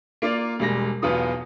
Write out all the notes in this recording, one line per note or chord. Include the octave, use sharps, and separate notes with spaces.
A#3 F4 D5
E1 G3 G#3 A#6
B1 E2 B3 F4 D#6